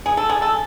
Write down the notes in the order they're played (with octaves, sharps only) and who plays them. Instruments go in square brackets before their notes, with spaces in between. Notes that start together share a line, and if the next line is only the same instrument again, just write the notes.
[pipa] G#4
A4
G#4
A4